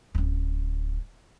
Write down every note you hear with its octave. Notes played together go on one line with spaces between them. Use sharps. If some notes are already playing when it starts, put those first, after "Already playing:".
D1 C#4